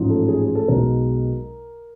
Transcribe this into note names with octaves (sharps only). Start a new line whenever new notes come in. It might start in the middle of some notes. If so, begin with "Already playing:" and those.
Already playing: A1 G#2 F3
A4
G#4
G#4
A4
B1 B2 G#3 A#4